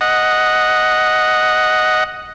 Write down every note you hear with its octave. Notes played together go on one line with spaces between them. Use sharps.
D#5 F#5